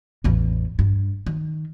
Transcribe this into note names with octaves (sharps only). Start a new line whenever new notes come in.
A1 E2
G2
D#3